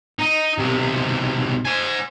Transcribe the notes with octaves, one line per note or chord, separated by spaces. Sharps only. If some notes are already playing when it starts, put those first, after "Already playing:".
D#4
B1 C3
C5 G#5